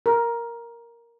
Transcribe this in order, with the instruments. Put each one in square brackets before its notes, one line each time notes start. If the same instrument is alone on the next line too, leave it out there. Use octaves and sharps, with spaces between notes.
[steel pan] A#4